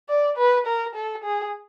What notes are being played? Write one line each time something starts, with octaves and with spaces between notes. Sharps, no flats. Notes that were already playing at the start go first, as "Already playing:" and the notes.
D5
B4
A#4
A4
G#4